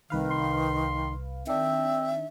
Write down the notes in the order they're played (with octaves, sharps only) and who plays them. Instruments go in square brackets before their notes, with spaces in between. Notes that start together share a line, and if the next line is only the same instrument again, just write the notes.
[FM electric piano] C2 B4 F5 [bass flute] D#3
[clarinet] C6
[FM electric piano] D#3 D4 [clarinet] C4 [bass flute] E5